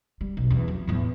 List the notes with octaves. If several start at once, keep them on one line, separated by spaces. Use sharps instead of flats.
G3
B1
E2 C4
F#3
E2 A2